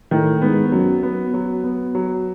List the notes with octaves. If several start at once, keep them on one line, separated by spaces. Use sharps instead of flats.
A2 D#3
G#2 B3
F#2 F#3
B3
F#3
B3
F#3